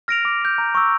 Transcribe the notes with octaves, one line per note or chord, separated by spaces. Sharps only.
F6 A#6 D7 F7
D6
G6 A#6
A#5
C#6 E6